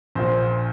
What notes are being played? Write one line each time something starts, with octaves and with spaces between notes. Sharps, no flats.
A#1 A#2 C5